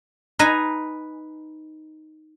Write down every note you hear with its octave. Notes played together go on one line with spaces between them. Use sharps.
D#4 B4 D#5 G#5 A#5